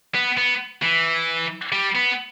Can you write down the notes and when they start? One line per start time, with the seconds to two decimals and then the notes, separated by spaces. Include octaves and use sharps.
0.15 B3
0.38 B3
0.82 E3
1.72 G3
1.95 B3